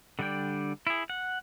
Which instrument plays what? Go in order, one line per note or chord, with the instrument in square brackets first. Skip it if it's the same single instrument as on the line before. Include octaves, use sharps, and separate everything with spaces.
[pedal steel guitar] D3 G3 D4 D5 G5
E4 G#4
F#5